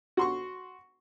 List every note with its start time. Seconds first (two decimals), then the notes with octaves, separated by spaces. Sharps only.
0.17 F#4 C6 C#6